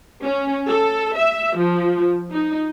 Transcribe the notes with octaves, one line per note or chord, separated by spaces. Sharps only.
C#4
A4
E5
F3
D#4